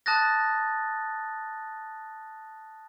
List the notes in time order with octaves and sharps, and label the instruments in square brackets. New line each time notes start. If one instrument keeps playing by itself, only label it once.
[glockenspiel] A5 D#6 F#6 A6 A#6